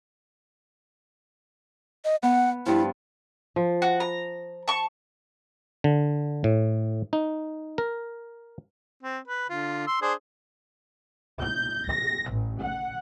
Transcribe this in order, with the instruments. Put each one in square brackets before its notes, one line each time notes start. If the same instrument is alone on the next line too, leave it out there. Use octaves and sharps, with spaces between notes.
[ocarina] D#5
[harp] B3 [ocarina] F#5
[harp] G2 F3 [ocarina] E4
[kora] F3
[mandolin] F#4
A#5
A5 C#6
[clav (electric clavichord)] D3
A2
D#4
A#4
[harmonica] C4
B4
D3 F4
C6 E6
D4 G#4 C5
[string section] G6
A#6
A1
F#5